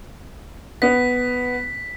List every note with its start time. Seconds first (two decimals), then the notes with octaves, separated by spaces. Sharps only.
0.82 B3 B6